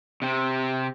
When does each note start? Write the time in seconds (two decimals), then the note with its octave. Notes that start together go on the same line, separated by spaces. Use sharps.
0.22 C3 C4